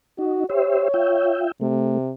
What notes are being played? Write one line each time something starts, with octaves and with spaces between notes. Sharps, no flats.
D#4 F#4
G4 C5 C#5 E5
F4 E5 G5
C3 A3